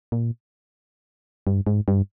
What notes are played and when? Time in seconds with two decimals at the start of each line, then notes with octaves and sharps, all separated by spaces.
0.12 A#2
1.47 G2
1.67 G#2
1.88 G2